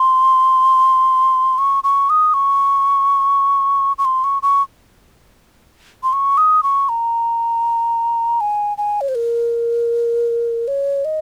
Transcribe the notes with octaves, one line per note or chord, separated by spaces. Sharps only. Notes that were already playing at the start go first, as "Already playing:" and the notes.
Already playing: C6
C#6
C#6
D#6
C#6
C#6
C6
C#6
C#6
C6
C#6
D#6
C#6
A#5
G#5
G#5
C#5
C5
A#4
C#5
D#5